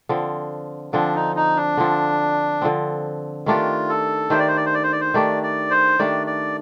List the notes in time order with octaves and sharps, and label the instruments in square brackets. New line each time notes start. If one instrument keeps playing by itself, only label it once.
[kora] D3 F3 C4
[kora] D3 F3 C4 [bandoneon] D4
[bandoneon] D#4
D#4
D4
[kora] D3 F3 C4
D3 F3 C4
[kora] D#3 A3 D4 G4 [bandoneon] F4
[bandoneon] A4
[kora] D#3 A3 D4 G4 [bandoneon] C5
[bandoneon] D5
C5
D5
C5
D5
C5
D5
C5
[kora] D#3 A3 D4 G4 [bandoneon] D5
[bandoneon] D5
C5
[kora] D#3 A3 D4 G4 [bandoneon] D5
[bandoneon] D5